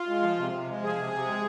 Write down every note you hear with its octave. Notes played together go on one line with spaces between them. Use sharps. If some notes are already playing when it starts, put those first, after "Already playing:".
Already playing: F4
G#3
F3
C3
C3
G#3
F3 G#4
C3
C3
G#3